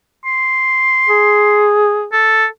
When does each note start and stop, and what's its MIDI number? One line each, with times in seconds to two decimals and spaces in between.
0.25 1.67 84
1.09 2.08 68
2.12 2.45 69